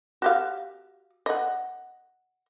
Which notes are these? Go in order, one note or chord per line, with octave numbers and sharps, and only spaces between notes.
F#4 G4 F5
D#5 F#5